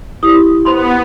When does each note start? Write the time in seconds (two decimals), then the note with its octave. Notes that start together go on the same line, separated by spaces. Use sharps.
0.23 E4 G4 D#6
0.65 B3 C5 B5 C6